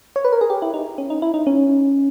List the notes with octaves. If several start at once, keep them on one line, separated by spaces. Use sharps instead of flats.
C#5
B4
A#4
G#4
G4
E4
D#4
C#4
D#4
E4
D#4
C#4